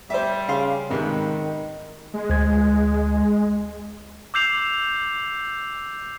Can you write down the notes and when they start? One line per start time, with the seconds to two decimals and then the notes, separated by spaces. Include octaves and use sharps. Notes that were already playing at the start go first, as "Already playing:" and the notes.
0.10 G3 C5 E5
0.49 C#3 F5 C6
0.90 G#2 C3 D#3 B4
2.14 G#3
2.30 D2 G#6
4.34 D6 E6 G6 C7 F7